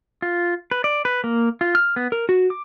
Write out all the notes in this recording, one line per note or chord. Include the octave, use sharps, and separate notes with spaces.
F4
B4
D5
B4
A#3
F4
F6
B3
A#4
F#4
D6